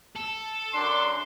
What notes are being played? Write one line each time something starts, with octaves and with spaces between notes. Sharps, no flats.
A4
F#2 D4 C6